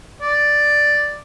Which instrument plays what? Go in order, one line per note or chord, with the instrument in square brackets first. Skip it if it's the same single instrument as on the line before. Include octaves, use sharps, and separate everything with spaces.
[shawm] D5